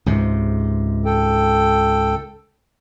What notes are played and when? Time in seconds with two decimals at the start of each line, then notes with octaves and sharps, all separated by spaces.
0.06 C#2 G#2 C3
1.05 A4 G5